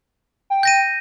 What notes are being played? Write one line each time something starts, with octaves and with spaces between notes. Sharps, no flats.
G5
G6 A#6 D#7